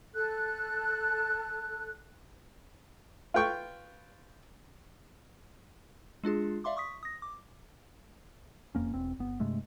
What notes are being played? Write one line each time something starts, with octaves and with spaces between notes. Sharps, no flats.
A4 F#6
F4 B4 G5 C#6
G#3 D4 F4 G#4
D5 E5 F5 C6 D6
C#6 D#6 B6
D#6 A#6
D6
E1 F2 A#3 C#4
E1 E2 C4
G1 B3
G2 C3 G#3 A3